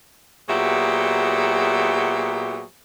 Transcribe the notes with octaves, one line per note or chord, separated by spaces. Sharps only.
A#2 F#3 B3 G4 G#4 E5